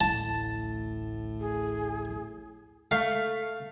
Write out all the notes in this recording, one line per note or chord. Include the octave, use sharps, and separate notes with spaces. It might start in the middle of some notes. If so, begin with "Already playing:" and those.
D1 A1 A2 A5
G#4
A3 F5